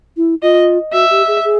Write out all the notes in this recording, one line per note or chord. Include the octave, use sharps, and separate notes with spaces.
E4
F4 D#5
F#4 E5
G4
G#4
G#4